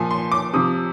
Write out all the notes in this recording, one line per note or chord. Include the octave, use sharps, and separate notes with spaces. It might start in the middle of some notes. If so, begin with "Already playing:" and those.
Already playing: A#2 F3 G#5
C6
D6
C3 F3 D#6